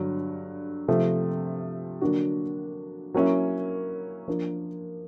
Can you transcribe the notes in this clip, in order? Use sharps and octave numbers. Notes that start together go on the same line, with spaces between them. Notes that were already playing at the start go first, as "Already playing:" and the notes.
Already playing: G2 D3 F#3
C3 F3 A3
D3 F#3 A#3 D4 F#4
F#3 A#3 C#4 E4
F3 A#3 D4